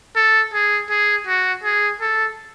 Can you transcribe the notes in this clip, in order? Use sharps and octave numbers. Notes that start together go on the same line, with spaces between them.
A4
G#4
G#4
F#4
G#4
A4